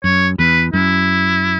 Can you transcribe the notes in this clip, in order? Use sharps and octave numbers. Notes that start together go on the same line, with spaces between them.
F#2 C#5
E2 B4
F#2 E4